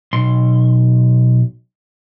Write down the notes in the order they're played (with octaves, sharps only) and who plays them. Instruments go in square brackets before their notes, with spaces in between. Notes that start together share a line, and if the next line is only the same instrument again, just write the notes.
[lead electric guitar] B1 C6